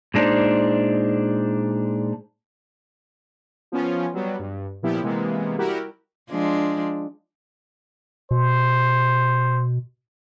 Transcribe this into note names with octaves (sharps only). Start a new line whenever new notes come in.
A#2 G#3 D4 D#4 C5
F3 B3 C#4 F4
F#3 G3 B3
G2
A#2 F3 B3 E4 G4
C3 E3 G#3 A#3 B3
G3 E4 F#4 G4 A#4
F3 G#3 D4
B2 C5